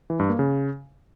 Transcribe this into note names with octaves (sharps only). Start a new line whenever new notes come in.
E3
G2
A#3
C#3